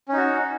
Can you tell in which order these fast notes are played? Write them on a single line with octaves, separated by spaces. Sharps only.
C#4 D#4 F#4